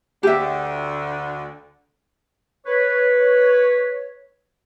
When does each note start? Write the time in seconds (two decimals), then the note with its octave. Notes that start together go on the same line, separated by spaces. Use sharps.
0.23 D2 D3 G4 E5
2.66 B4 C#5